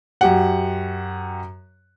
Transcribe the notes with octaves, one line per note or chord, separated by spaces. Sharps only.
F#2 G4 F#5